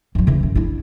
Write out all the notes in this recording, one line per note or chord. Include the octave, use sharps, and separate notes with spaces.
A1 F#3
C#3 E3
F#2
D4 E4